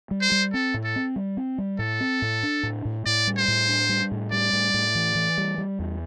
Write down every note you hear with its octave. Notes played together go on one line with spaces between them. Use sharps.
G3
C5
G3
C4 A4
A2
A4
C4
G3
C4
G3
A2 A4
C4
A2
D4
A2
A2
A2 D5
G3
C5
A2
D4
G3
A2
G3 D5
A2
A2
E3
E3
G3
G3
E2